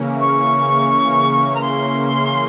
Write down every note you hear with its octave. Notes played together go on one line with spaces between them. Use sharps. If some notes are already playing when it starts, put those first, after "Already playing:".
Already playing: C#3 E3 A#3 C#4
C#6
A#5
C6